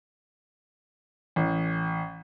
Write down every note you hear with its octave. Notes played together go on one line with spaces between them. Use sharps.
A1